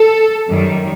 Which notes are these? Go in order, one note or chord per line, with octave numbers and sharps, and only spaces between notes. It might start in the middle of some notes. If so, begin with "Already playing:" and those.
Already playing: A4
F#2 D#3 G3